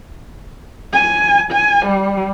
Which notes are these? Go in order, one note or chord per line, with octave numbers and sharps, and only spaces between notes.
G#5
G#5
G3